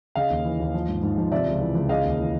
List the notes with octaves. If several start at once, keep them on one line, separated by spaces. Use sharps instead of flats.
C#3 D#5 F5
D#2
E3
D#2
F3
G#2
G#2
F3
C3 D5 E5
C#2
E3
C#2
C#3 D#5 F5
D#2
E3